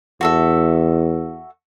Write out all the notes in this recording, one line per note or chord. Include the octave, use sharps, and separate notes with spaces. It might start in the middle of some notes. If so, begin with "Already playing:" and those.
E2 F#4 A4 E5